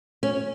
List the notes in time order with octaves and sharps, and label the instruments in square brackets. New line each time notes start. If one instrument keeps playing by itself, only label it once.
[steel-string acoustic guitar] C#4